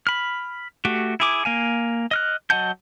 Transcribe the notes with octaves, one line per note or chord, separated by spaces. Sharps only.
B5 F6
A3 F#4 G4
E4 G#4 D6
A#3 F5 G#5
D#5 F6 F#6
F#3 D#5 F#5 A5 G6